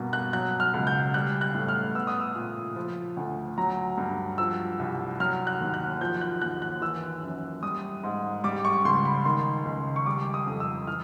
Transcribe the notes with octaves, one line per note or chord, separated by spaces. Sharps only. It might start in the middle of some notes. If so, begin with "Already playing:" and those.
Already playing: G2 B2 G3 A#3
F#6
F#3 F#6
F6
C#2
G6
G3 F#6
F#6
A2
F6
B3 E6
D#6
E6
A#2
F3
D2
F#3 A#5
G2
F3 E6
C2
F#3 F6
F#6
D#2
F#6
F3 G6
F#6
D#2 F#6
F#6
E3 E6
F#2
G3 D#6
G#2
G3 D6
C#6
C#2 C6
B5
D#3 C6
C#2
C#6
G3 D6
D#6
F2
E6
E3 F6